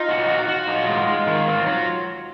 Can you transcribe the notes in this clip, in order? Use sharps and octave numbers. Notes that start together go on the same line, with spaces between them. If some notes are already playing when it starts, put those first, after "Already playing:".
Already playing: D#4 F4
F#4
F#4
F#4
D#4
G#3
G#3
D#3
C4
F#3